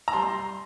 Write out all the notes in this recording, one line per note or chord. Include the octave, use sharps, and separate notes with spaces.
A#5
G3 C6